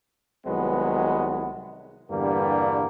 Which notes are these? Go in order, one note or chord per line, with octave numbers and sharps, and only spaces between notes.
C2 D#3 F#3 G#3 B3 B4
E2 G2 D3 G3 A#3 B3